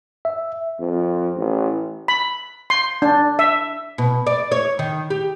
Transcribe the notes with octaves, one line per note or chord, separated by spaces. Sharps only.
E5
F2
A1
B5
C6
D4
E5
B2
D5
C#5
D#3
G4